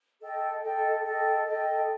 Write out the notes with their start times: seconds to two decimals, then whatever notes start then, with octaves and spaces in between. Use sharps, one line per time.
0.20 A4 D#5 G5
0.62 A4 D#5 G5
1.04 A4 D#5 G5
1.46 A4 D#5 G5